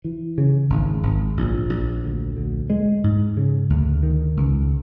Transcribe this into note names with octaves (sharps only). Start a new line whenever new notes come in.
E3
C#3
G#1
G#1
A#1
A#1
D2
D2
G#3
G#2
C#3
D2
D#3
C#2